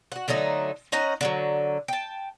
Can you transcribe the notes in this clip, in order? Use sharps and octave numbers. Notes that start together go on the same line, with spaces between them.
F#4 F#5
D3 F#3 A3 D#4
C#4 D#4 F#5 A#5
D3 E3 F#3
G5 A5